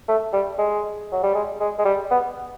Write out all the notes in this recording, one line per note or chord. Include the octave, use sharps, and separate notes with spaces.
A3
G3
G#3
F#3
G3
G#3
G#3
G#3
G3
B3